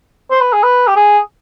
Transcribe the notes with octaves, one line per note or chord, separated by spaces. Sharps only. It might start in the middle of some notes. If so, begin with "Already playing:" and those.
C5
B4
G#4
B4
G4
G#4